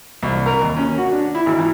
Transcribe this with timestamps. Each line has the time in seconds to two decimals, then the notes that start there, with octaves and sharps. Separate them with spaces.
0.23 C2
0.46 A#4
0.61 D#2
0.76 C#4
0.98 F#4
1.12 D4
1.35 E4
1.46 G#1
1.59 E3